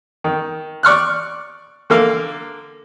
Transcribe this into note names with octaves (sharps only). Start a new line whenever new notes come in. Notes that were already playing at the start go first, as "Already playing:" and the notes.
D#3
D5 C#6 F6 F#6
D3 A#3 F5